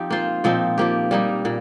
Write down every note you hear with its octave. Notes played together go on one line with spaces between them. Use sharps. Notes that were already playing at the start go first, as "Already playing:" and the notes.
Already playing: F3 C4 D#4 G4
A#3 F4 C5
A#2 F3 C4 D#4
F3 A#3 G4
G3 A#3 D#4
A#2 A#3